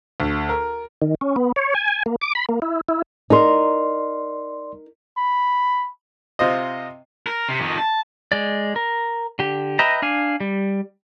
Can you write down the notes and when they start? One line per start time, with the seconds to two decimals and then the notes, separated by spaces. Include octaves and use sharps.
0.20 D2
0.49 A#4
1.02 D#3
1.21 C#4
1.36 B3
1.56 C#5
1.75 G#5
2.06 A#3
2.21 D6
2.35 B5
2.49 A#3
2.62 E4
2.89 E4
3.30 D#4 A#4 D5 C6
5.17 B5
6.39 C3 F4 C5 D#5
7.27 A#4
7.49 C3
7.60 F2 D#3
7.78 A5
8.32 G#3 D5
8.76 A#4
9.39 D3 G4
9.79 B4 D#5 E5 G5 A#5
10.02 D4 F5 G#5
10.40 G3